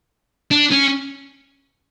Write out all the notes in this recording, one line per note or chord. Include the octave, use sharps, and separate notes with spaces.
D4
C#4